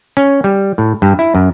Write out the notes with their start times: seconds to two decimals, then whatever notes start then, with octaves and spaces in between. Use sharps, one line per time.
0.17 C#4
0.44 G3
0.78 A2
1.02 G2
1.19 E4
1.35 F#2